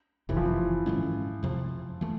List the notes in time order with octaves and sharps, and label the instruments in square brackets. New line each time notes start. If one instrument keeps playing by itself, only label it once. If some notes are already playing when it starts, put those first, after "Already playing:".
[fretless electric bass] F#1 F2 C3 D#3 [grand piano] E3
[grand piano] F3
E3
[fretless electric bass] G#2 D#3 G#3 C#4
F2 C3 F3
E3 A3